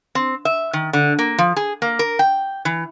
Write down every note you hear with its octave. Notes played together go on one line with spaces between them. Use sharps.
C4
E5
D#3
D3
A#3
F3
G#4
A#3
A#4
G5
E3